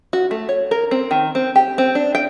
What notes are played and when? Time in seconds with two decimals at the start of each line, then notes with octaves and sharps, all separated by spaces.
0.13 F#4
0.31 A3
0.49 C#5
0.71 A#4
0.91 C4
1.11 D#3
1.35 C4
1.56 G4
1.78 C4
1.95 D4
2.15 G5